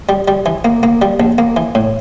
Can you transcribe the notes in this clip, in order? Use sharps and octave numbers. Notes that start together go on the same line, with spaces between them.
G3
G3
E3
A#3
A#3
G3
A#1
A#3
E3
A2